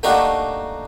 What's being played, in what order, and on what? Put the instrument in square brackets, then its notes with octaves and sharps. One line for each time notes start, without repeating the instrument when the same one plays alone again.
[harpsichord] A3 A#3 D4 D#4 F#4 G4